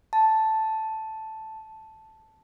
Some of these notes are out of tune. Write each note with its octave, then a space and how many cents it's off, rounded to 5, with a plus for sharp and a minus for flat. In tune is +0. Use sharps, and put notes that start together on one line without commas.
A5 +0